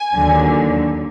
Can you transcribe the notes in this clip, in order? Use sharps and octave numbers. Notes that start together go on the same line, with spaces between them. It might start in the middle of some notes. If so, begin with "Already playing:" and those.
Already playing: G#5
D#2 D3 F#3